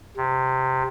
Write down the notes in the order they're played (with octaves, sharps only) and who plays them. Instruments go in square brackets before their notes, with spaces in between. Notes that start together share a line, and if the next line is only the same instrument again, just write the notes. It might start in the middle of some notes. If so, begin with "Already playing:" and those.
[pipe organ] C3